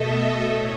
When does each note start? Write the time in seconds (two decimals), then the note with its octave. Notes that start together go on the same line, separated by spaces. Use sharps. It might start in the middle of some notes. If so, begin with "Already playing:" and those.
Already playing: B2 A3 A4 D#5 E5
0.13 D#5
0.45 A2 C#5